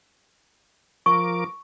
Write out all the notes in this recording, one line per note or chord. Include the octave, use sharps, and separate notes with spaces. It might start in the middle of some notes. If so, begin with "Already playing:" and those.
F3 A#4 C#6 D6